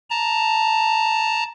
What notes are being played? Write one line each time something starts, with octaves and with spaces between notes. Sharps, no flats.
A5 A#5